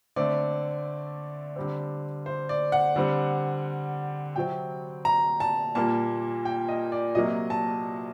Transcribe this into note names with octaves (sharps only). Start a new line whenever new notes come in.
D3 A3 C4 D5
D3 G3 C4
C5
D5
F#5
D3 G3 C4
C3 F#3 C4 G5
A#5
A5
A#2 G3 A#3 A5
G5
D#5
D5
C3 F#3 A#3 D#5
A5